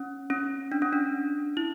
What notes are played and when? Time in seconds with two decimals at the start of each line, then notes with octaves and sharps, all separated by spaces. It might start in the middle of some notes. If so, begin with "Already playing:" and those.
Already playing: C#4
0.30 C#4
0.72 D4
0.82 C#4
0.93 D4
1.57 E4